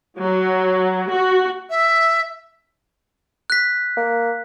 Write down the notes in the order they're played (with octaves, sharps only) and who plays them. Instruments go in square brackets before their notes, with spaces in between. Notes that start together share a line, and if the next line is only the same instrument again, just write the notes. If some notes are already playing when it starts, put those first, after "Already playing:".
[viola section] F#3
F#4
[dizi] E5
[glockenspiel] F#6 B6
[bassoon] A#3